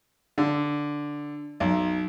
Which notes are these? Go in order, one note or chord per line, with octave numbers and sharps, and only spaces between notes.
D3
B1